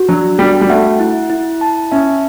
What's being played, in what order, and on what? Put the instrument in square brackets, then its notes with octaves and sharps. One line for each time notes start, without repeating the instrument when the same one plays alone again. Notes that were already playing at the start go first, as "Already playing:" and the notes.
Already playing: [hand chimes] F#4
[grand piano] F#3 [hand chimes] D4
[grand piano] G3 [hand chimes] F#4
[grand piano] G3
[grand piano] A3 [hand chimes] F#5
[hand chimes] E4
E4
A5
[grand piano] C#4 [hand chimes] E5